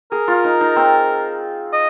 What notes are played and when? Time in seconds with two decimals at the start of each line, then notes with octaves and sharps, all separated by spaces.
0.12 G#4 A#4
0.28 F4
0.44 D#4
0.61 D#4
0.76 C4
1.73 D#5